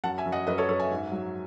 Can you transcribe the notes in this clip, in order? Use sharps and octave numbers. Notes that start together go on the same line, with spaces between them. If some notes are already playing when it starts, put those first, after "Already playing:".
F#2 F#5 A5
E5 G#5
F#2
D#5 F#5
F#2 B4 D#5
A4 C#5
F#2 A4 C#5
E5 G#5
G#2
F#3